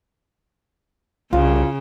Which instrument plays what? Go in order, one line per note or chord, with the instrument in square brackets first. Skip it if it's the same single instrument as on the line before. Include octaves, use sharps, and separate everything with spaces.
[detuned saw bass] C2 [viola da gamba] C#3 [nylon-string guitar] F4